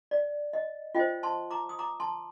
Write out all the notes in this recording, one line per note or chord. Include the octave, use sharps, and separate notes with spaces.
D5
D#5
F4 C5 D#5 G5
A5 C6
A#5 D6
D#6
A#5 D6
A5 C6